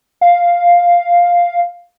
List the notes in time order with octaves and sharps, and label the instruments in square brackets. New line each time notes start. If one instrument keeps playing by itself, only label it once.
[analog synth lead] F5